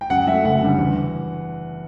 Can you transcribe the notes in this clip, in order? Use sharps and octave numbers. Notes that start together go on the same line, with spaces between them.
G5
F#2 F#5
F#3 A3 E5
F#1 F#5
F#2 D3 G3
E2